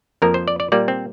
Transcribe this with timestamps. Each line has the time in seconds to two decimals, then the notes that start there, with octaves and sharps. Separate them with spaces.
0.22 F2 F3 A#3 A#4
0.34 C5
0.48 D5
0.60 D5
0.72 A#2 G3 A#3 D5
0.88 C4